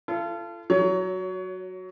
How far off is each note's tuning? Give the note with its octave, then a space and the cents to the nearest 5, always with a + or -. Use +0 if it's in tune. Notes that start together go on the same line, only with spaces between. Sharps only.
F4 -35 A4 +0
F#3 +0 C#5 +25